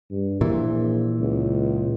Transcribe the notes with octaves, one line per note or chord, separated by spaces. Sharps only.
G2
A#1 A#2 E3
C#2